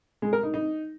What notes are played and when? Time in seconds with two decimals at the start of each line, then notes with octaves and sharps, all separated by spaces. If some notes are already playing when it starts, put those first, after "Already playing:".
0.22 G#3
0.33 A#4
0.43 D#4
0.54 D#4